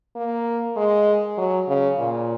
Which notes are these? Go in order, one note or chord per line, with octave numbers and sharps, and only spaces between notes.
A#3
G#3
F#3
C#3
A#2